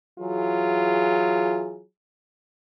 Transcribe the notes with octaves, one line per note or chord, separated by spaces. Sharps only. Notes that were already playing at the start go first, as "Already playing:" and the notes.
E3 F#3 F4 G#4